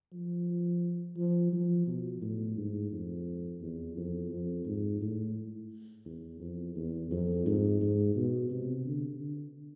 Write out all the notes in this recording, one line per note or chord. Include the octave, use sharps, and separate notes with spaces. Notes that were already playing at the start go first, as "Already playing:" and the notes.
F3
F3
F3
B2
A2
G#2
F2
E2
F2
F2
G#2
A2
E2
F2
E2
F2
G#2
G#2
B2
C3
D3
D3